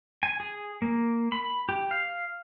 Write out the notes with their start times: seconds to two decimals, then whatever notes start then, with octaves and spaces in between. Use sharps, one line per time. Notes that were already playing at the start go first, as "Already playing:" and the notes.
0.23 G#5
0.40 G#4
0.82 A#3
1.32 B5
1.69 G4
1.91 F5